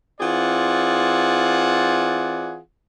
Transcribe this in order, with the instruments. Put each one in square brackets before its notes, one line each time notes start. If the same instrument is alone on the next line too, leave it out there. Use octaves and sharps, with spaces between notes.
[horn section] E3 C4 F4 G#4 D5 F#5